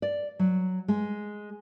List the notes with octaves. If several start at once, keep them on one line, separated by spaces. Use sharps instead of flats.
D5
F#3
G#3